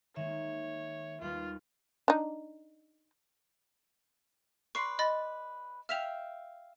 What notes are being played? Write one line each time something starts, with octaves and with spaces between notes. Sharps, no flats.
D#3 G#3 A#3 C#5 E5
D#2 G3 F4 B4
D4 D#4
B4 D5 C6 C#6 C7
D#5 B5 A6
E5 F5 G5 F6 B6 F7